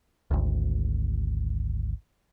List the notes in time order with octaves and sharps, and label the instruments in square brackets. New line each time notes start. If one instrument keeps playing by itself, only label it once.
[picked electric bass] G#1 D2